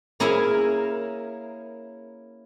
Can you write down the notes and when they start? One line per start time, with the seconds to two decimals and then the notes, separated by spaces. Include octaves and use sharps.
0.20 A#3 C#4 E4 G#4 A#4